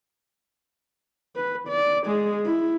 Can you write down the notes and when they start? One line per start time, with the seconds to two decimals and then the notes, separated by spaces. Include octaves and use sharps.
1.35 B4
1.68 D5
2.06 G#3 G#4
2.45 E4